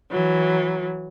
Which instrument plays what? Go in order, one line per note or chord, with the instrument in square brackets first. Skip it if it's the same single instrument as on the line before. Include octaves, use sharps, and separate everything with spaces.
[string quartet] E3 F#3